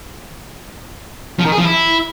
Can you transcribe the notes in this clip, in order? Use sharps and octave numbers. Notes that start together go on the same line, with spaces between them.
F3
D#3
G#4
F3
E4